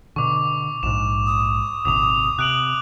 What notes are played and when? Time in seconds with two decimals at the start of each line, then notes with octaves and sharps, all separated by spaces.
0.16 B2 D3 C#6 D6
0.83 A#1 G#2 E7
1.27 D#6
1.85 D#1 G#1 C3 D6 F7
2.39 C3 F#6 D7 F#7